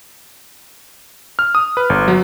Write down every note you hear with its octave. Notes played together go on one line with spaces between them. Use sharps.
F6
D#6
B4
G1
F#3